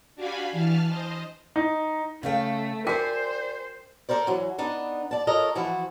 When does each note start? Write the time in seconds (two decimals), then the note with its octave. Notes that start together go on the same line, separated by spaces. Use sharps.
0.15 D4 F#4 G4 F5 G#5 B5
0.52 E3 A5 F6
0.89 C5 D#5
1.56 D#4
2.23 C#3 A3 F5 G5
2.87 F#4 A#4 C5 D5 G5 G#5
4.09 A4 A#4 C5 D5
4.27 E3 F#3
4.58 B3 D4 D#4
5.11 D5 A5
5.27 F4 A4 A#4 C#5 D#5
5.55 E3 F3 E4 F#4